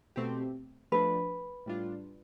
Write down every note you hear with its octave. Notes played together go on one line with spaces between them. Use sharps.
B2 A3 C4 G4
F3 A3 D4 B4
A2 G3 D4 F4